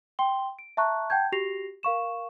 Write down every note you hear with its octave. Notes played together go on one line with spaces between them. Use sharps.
G5 C6 G7
D7
E5 A5 A#5 C#6 F#6
F#5 G5 A5 G6 G#6
F#4 G4 A#6 C7 F7
A#4 F5 C#6 E7